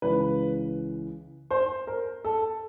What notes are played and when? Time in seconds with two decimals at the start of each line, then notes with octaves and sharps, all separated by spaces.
0.02 C#2 C#3 E3 B4
1.51 C5
1.87 A#4
2.24 A4